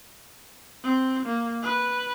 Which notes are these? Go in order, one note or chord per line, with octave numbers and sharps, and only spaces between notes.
C4
A#3
B4